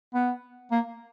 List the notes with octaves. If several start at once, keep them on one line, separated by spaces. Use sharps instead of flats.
B3
A#3